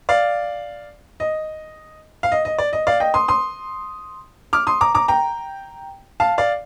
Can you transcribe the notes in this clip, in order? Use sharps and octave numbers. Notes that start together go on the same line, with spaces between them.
D5 F5
D#5
F5
D#5
D#5
D5
D#5
D5 F5
D#5 G5
C6 D#6
C6 D#6
D6 F6
C6 D#6
A#5 D6
A#5 D6
G5 A#5
F5 A5
D5 F5